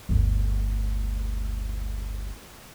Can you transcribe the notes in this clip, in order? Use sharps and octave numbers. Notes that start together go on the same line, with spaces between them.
G1 D2